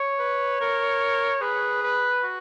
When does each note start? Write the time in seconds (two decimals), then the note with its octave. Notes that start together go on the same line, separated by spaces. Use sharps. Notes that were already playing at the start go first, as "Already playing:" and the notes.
Already playing: C#5
0.19 B4
0.60 A#4
1.41 G#4 B4
1.83 B4
2.23 F#4